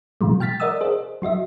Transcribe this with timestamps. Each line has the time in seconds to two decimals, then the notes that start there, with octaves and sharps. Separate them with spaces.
0.21 B2 E3 F#3 G#3
0.40 G5 F6 A6 B6
0.60 A#4 D5 D#5 F#5 D#6 E6
0.81 G#4 C5 D#5
1.22 F#3 F#4 D#5 E5